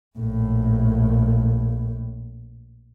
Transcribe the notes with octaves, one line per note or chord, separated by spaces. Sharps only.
A#1 A2